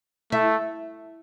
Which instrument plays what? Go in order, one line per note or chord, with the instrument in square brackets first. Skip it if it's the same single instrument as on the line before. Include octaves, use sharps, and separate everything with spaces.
[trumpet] A3 [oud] E4